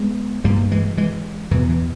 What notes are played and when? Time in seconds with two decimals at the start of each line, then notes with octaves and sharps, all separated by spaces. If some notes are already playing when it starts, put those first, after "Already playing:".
Already playing: G#3 B3
0.44 G2 G3 A#3
0.71 E3 G#3
0.97 E3 G#3
1.51 E2 B2 E3
1.69 E3